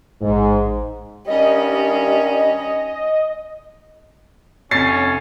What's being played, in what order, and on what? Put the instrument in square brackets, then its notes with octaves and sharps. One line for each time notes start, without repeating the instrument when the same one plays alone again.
[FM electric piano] A1 [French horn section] G#2
[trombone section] G2 D#3 G3 [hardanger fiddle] C#4 [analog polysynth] D#5
[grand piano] F1 A6 C7 [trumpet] C#4 [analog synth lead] C#5